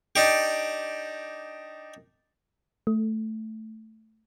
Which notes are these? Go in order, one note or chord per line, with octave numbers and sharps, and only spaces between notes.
D4 D#4 G4
A3